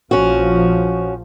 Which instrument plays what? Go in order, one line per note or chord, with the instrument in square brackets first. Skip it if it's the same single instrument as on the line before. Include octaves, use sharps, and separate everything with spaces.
[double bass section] A#1 F3 [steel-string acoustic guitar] C#4 F#4